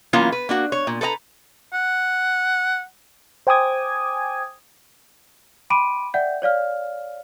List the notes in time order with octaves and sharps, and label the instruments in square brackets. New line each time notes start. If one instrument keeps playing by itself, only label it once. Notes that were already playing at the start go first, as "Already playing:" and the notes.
[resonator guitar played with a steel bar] E3 F#3 A#3 C#4 E4 F4
B4
A#3 D4 F#4
C#5
A#2
A4 B4 D5 A#5
[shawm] F#5
[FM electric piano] C5 G5 G#5 D6 D#6 G#6
[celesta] G5 B5 C6 D6 D7 D#7
D5 E5 F#5 G5 G6
C#5 D5 F5 F6